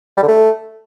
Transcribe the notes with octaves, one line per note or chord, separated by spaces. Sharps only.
G3
D3
A3